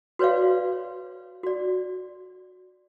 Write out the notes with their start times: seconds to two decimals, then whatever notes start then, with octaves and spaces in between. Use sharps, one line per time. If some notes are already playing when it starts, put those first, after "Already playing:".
0.19 F#4 B4 C#5 D5 F5
1.43 F#4 D5